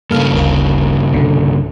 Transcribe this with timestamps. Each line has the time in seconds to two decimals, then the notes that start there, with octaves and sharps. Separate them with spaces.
0.11 G2 C#3 A#3 A4 F5
0.33 G1 D2 A#4
1.12 C2 B2 D3